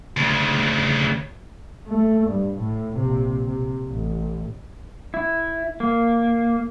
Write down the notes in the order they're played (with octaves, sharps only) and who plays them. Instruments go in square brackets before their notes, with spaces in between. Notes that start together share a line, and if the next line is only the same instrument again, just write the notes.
[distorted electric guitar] D2 C#3
[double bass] A3
G2
A2
A#1 C3
C3
A1
[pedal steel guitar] E4
A#3